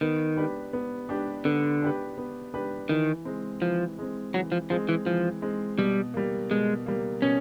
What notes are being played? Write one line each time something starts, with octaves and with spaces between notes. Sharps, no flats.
D#3 B3
D4 G4 B4
B3
D4 G4 B4
D3 B3
D4 G4 B4
B3
D4 G4 B4
D#3 E3
G#3 C4
E3 F3
G#3 C4
E3 F#3
F3
F3 G#3 C4
E3
E3 F3
G#3 C4
B2 G3
G3 A#3
B2 G#3
G3 A#3
B2 C#4